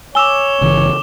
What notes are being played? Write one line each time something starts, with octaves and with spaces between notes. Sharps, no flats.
C#5 G#5 D6 E6 E7 G7
G1 C#3 E3